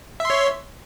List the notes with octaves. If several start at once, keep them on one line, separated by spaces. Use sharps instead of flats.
C#5 E5 C6